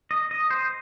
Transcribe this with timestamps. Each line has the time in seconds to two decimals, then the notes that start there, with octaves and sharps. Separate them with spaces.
0.11 D#5
0.31 D#5
0.51 C5